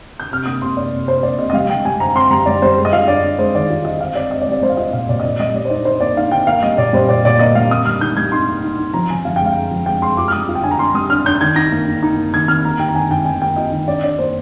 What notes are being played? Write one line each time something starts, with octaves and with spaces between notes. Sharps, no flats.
G6
C3 F6
A#3 D#6
C3 C6
A#3 D5
C3
C3 C5
A#3 D5
C3 D#5
D#5
G3 F5
G3 G5
G3 G#5
C4 A#5
C4 C6
G3 A#5
G3 D5
G3 C5
G#3
D#5
F4 F5
D4 D5
D4
G#3 C5
D#3 D5
F4
F4 D#5
C4 F5
C4 D5
C4 D#5
D5
G3
D5
G3 C5
F5
F4 D#5
A#2 F5
A#2 D5
D#5
A#3 D5
G3 D#5
G3 D5
C5
D#4 D5
D#4 C5
A#3 D5
D#4 F5
D#4 G5
A#3 F5
G3 D#5
A#2 D5
G3 C5
A#2 D5
A#2 D5
A#3 D#5
G3 F5
A#3 D#6
G3 F6
D#4 G6
G3 G#6
D#4 C6
A#3
D#4
D#4
F3 A#5
F3 G#5
F3 F5
G#3 G5
F5
G#3
F3
G#3 G5
G#3 C6
F4 D6
F6
G3 D#6
F4
G5
D4 G#5
A#5
D4 C6
G3 D#6
D4 F6
D4 G6
D#3 G#6
D#4 A#6
A#3
D#4
D#4
A#3
D#3 G#6
D#3 F6
A#3 A#5
D#3 G5
A#5
D#3 G#5
D#3 G5
D#3 G#5
A#3 G5
F4 D#5
D#3
D4 D5
D4 D5
A#3 C5